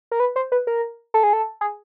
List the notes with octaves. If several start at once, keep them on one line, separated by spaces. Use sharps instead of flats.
A#4
B4
C5
B4
A#4
A4
G#4
A4
G#4